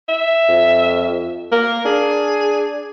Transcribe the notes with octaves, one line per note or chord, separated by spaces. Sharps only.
E5
F2
A#3 A#4
D4 G#4